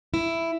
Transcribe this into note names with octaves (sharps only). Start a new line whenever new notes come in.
E4